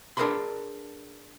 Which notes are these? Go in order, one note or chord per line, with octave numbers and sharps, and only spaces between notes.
D4 G#4 A#4 B4 B5 C6